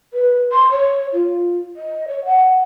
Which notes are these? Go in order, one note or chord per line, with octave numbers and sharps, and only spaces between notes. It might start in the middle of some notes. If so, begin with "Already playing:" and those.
B4
C6
C#5
F4
D#5
C#5
F#5